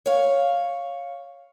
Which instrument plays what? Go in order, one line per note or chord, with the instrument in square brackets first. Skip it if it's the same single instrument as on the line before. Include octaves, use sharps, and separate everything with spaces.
[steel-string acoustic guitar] C#5 F5